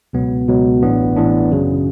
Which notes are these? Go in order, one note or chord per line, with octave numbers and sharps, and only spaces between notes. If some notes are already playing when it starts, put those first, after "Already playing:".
C#2 B2 F#3 B3
C#2 B2 F#3 B3
A1 A2 E3 B3 D4
A1 A2 E3 B3 D4
F#2 C#3 F#3